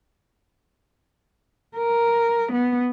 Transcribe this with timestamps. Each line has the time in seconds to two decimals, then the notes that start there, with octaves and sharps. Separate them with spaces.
1.77 A#4
2.52 B3